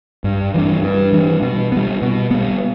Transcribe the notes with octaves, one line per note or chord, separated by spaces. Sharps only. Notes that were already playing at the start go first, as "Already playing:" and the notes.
G2
E3 G3 D4
G2
E3 G3 D4
B2
G3 B3
B2
G3 B3